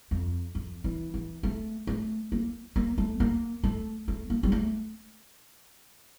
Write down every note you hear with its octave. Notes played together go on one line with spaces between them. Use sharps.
F2
F2
E3
E3
A3
A3
A#3
A#3
A3
A#3
A3
A3
A#3
G3
A3